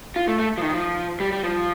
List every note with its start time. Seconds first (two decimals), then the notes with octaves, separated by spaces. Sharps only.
0.16 F4
0.28 A3
0.39 A3
0.58 F3
0.62 D#3
0.74 F3
1.20 G3
1.32 G3
1.43 F3